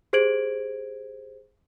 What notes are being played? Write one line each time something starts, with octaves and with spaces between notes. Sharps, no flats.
G4 G#4 C5 G#6 D7 F#7